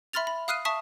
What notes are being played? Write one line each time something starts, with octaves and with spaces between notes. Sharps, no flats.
E5 B5 C6 F6 A6 F7
B5
F5 D#6 F6 F#6 C7 D#7
E5 A5 C#6 D#6 B6